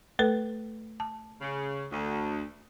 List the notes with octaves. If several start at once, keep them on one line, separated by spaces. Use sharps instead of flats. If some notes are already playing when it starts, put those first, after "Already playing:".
A3 A4 B4
A5
C#3
D2